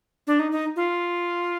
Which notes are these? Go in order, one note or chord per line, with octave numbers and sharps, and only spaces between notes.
D4
D#4
D#4
F4